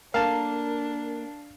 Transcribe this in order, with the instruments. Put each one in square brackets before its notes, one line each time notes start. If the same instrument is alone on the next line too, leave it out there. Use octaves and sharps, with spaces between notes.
[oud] A#3 A4 [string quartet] D4 [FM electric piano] A#4 [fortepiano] F5 A5